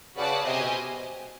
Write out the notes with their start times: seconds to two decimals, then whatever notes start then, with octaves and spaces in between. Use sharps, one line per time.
0.16 C#3 F#4 B4 D5 F#5 A5
0.45 C3 G4 C5 D#5 G#5
0.60 B2